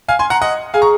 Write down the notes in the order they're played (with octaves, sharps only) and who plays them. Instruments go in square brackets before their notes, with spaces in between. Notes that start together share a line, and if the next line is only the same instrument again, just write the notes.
[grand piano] F5 G#5
G#5 C6
F#5 A#5
D#5 F#5
[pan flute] G#4 [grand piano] F5 G#5
[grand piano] A#5 C#6